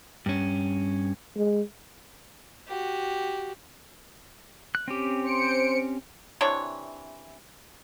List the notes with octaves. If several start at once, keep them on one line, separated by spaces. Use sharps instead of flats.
G2 C#4
G#3
F#4 G4
F#6
C4 C#4 G4
C5 C#7 D7
C3 E3 D4 C#5